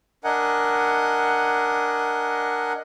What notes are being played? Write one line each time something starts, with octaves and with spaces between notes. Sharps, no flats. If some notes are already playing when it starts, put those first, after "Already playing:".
D4 A#4 D#5 F#5 G#5